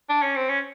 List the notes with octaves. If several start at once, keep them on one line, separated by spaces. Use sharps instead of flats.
D4
C#4
C4
C#4